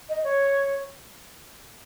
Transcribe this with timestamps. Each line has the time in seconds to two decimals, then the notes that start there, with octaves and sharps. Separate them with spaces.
0.09 D#5
0.24 C#5